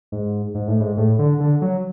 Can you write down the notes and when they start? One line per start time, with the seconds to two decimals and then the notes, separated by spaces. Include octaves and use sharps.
0.12 G#2
0.55 G#2
0.68 A2
0.80 G#2
0.97 A2
1.19 D3
1.40 D3
1.62 F#3